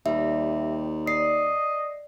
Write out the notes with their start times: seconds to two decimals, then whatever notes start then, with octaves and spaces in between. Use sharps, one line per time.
0.06 D#2 G3 E5
1.07 D5 D#5 C7